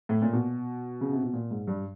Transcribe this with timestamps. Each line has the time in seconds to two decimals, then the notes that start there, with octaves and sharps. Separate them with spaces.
0.09 A2
0.22 A#2
0.33 B2
1.01 C#3
1.12 C3
1.23 B2
1.33 A#2
1.51 G#2
1.67 G2